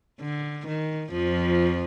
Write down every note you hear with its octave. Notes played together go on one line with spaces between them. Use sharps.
D3
D#3
F2 F3